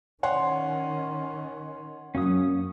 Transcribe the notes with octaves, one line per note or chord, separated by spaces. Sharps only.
D#3 C#4 C#5 F#5 C6
F#2 A#3 C#4 D#6